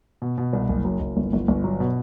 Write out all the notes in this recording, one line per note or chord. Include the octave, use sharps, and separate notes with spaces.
B2
B2
C2
F#1
F#3
F#1
G1
G1
G1
F#3
B2